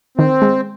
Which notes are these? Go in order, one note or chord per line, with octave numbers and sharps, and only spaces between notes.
D#3 C4
G#3